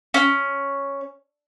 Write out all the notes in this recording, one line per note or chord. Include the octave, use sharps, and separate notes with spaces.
C#4